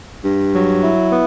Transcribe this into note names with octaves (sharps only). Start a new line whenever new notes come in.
G2
F#3
E4
B3